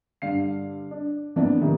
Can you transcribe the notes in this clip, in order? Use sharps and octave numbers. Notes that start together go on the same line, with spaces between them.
G2 D3 F5 C7
D4
F2 E3 F3 A#3 B3 D4
A2 C3 D#3 E3 G3 A3